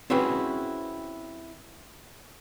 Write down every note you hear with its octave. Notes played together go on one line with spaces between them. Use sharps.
C4 C#4 E4 F#4 G#4 B4